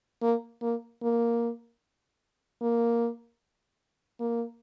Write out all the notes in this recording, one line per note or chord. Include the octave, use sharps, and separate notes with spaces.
A#3
A#3
A#3
A#3
A#3